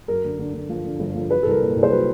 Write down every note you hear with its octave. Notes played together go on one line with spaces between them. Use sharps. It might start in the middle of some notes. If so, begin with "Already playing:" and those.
F#2 A#4
D3
D3
D3
F3
D3
G1
F3
F#3 B4
A4
C2 A#4
A#2
C2
C5
F#3 B4